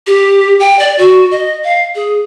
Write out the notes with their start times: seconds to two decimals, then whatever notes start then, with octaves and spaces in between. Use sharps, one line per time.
0.07 G4
0.60 G5
0.79 D5
0.98 F#4
1.31 D#5
1.64 F5
1.95 G#4